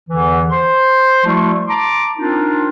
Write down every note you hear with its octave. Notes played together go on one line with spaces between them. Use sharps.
E2 D3 E3
C5 C6
F3 G3 A3 E4 F#4
A5 A#5 C6 D6
C4 D4 D#4 F4 A#4